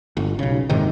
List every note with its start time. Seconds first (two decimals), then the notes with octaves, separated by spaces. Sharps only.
0.17 G1
0.39 B1 C#3
0.69 F#1 G#2 C3 D#3